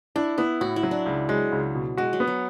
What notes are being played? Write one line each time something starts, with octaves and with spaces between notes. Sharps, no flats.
D4 E4
B3 E4
A2 F#4
E4
F#3
D4
C#2
F#3 G#3
C#2
B2
G#3 F#4
F#3
B3
F#3